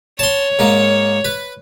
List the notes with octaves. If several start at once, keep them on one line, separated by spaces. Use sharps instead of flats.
C#5 A5 C6
G#2 A#3
B4